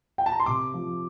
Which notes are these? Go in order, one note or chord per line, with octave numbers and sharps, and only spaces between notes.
G5
A5
A#5
C6
C3 D6
F3